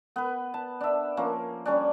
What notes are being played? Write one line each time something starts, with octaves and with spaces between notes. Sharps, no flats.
B3 B4
A5
D4 E5
F3 A#3 C#4
G3 C#4 D4